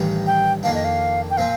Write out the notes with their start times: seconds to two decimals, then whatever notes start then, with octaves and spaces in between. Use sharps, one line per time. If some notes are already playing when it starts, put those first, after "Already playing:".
Already playing: A1 G2 D#3 G3
0.27 G5
0.63 F2 D#3 A#3 D4 F5
0.74 D#5
0.85 F5
1.30 G5
1.37 A#2 F3 C4 F5